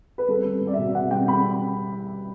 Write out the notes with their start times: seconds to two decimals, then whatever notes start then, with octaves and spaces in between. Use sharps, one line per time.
0.18 B4
0.28 G3 A4
0.45 G3
0.61 G3
0.67 D5
0.73 B2 E5
0.95 B2 F#5
1.11 G3 G5
1.28 G3 B5